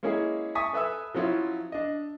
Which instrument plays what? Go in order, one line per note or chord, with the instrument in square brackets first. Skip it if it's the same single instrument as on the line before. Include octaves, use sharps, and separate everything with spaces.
[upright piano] G#3 A#3 C#4 E4 G#4
E5 G#5 A5 C#6 D#6 B6
A4 B4 E5 G#5 E6
F3 F#3 C#4 E4 F4
D4 D#5